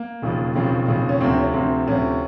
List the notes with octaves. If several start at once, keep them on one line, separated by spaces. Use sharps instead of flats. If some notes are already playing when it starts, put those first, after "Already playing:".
Already playing: A#3
E1 D#2 C#3 F3
E1 D#2 C#3 F3 C4
E1 D#2 C#3 F3
C#4
D2 C3 F3 C4
C#4
D2 C3 F3 C4
D2 C3 F3 C#4